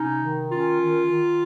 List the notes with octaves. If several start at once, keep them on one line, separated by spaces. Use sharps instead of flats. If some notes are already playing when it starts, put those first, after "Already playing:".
Already playing: C3 C#4 D#4
D#3
C#4 F4
D#3
D#3